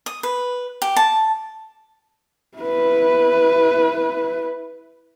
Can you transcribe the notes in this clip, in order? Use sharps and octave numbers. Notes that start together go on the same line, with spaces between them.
D#6
B4
G4
A5
E4 B4